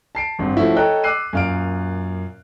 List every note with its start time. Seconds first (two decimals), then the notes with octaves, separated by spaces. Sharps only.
0.15 A5 C7 D7
0.39 G#1 G2 C4
0.56 F3 A3 C#4 E4 F#4
0.77 A4 C#5 D#5 G5 A#5 F#6
1.04 D6 E6 F#6 C7 D#7
1.33 F#2 A#2 F5 F6 D7